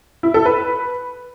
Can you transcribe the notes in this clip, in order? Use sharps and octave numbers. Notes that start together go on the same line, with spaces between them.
E4
A4
B4